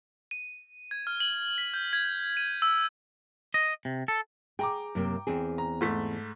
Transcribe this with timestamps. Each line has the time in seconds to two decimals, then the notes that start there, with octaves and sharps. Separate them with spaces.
0.31 D#7
0.91 G#6
1.07 F6
1.20 F#7
1.58 B6
1.74 G6
1.93 G#6
2.37 D#7
2.62 E6
3.54 D#5
3.85 C3
4.08 A4
4.59 G#4 G5 A#5 D6
4.95 F#2 C3 A#3
5.27 E2 C4 G#4
5.58 A#5
5.81 G#2 A3 B6